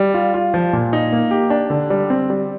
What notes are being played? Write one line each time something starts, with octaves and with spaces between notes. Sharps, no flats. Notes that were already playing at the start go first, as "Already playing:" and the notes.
Already playing: G3
F4
F4
F3
A#2
D#4
A#3
G4
D4
D3
G3
C4
G3